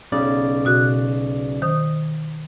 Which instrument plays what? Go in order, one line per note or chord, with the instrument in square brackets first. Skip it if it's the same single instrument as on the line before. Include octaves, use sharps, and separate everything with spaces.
[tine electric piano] B1 C#3 D5
[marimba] B2 F#4 F#6
D#3 C5 D#6